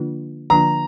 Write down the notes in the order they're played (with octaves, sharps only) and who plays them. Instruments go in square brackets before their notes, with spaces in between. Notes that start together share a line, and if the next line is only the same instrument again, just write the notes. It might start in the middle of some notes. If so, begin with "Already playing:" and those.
Already playing: [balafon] D3 F3 A#3 D4 F4
[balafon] D3 F3 A#3 D4 F4 [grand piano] A#5